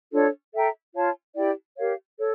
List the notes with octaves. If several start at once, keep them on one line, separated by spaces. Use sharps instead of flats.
D4 F4 A4 C#5
A4 E5 G5 A#5
F4 C#5 F5 A5
E4 G4 D5 G5
G4 A#4 C#5 F5
A4 C#5